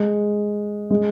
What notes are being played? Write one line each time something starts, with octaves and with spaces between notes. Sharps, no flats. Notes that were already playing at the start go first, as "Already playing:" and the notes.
Already playing: G#3
G#3